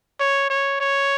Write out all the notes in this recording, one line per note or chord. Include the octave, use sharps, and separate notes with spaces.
C#5
C#5
C#5